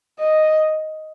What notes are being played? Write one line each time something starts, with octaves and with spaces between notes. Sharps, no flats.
D#5